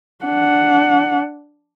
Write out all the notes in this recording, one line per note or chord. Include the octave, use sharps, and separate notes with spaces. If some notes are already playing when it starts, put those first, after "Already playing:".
D4 F#5